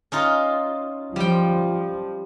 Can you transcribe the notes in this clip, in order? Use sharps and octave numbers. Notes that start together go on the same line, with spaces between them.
C#4 D#4 F4
F3 G3 G5